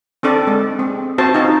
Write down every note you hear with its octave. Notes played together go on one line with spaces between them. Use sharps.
C4 D4 A4 D5
G#3
C4
C4 F#4 C5 A5
D#4 F4 F#4